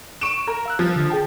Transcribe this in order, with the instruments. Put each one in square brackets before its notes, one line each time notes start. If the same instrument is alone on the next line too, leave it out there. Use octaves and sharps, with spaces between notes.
[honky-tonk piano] C#6 D7 E7
A#4
[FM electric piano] F5 E6 F#6
[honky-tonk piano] F3
[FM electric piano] D3
G#4 G5 A5